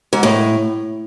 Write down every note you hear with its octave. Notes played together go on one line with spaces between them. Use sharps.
G#2
A2